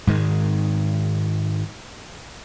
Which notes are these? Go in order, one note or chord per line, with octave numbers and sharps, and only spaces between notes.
G#2 D#3 G#3